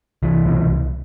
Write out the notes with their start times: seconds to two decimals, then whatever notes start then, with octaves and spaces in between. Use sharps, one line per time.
0.23 C2 E3
0.46 B2